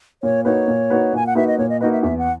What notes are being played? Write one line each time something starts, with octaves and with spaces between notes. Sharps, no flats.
A#2 C#5
A#3 D#4 F#4 B4 C#5
A#2
A#3 D#4 F#4 B4
A#2 G#5
F#5
A#3 D#4 F#4 B4 E5
D#5
A#2 C#5
D#5
A#3 D#4 F#4 B4 D#5
E5
E2 E5
F#5